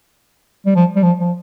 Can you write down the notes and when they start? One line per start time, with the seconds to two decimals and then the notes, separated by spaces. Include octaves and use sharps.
0.66 G3
0.76 F3
0.96 G3
1.03 F3
1.20 F3